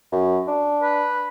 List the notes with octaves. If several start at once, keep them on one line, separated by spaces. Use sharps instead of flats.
F#2
D4
B4